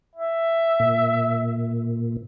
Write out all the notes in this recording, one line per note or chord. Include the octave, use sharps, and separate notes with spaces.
E5
A#2